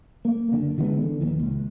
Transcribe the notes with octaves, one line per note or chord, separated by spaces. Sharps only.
A#3
F#1 D3 D4
D3 E3 G#3 B3
D3
A#1 D#2 E3
C#2